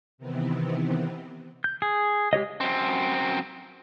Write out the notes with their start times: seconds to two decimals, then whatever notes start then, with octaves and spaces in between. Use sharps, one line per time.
0.18 C3 D#3 E3 B3 C4
1.64 G6
1.82 G#4
2.33 G#3 G4 C#5 D#5
2.61 F#2 C4